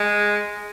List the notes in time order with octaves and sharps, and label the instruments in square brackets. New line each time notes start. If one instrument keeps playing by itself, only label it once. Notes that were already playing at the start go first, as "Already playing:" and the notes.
Already playing: [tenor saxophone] G#3